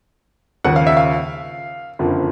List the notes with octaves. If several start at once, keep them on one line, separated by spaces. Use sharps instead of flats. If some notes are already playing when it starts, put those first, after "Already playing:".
D#2 C#3 F3 F#5
F5
E5
F5
F#1 F2 D3 F3